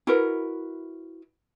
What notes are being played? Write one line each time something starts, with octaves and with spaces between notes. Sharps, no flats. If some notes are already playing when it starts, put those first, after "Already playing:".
E4 F#4 A#4 B4